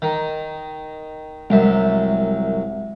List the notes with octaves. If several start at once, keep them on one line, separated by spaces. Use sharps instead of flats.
D#3
C2 F#2 G#3 E5